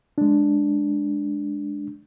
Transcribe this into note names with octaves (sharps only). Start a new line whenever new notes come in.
G#3 D4